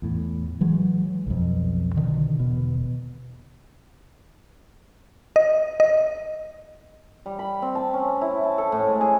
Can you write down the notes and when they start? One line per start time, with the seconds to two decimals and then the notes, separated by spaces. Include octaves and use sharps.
0.02 E2 A2
0.61 E3 F#3 G#3
1.27 B1 F2
1.96 B2 D3 D#3
2.39 E1 B2
5.36 D#5
5.80 D#5
7.26 G3
7.39 B5
7.62 C4
7.75 A5
7.94 C#4
8.21 E4
8.43 A5
8.58 A4
8.72 A2
8.88 G#3
9.01 G#4